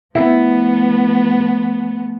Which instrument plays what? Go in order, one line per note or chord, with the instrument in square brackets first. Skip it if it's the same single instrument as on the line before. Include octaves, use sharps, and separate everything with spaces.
[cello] F3 A3 [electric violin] B3 [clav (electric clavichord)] E4